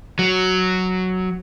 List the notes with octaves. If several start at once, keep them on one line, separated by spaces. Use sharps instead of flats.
F#3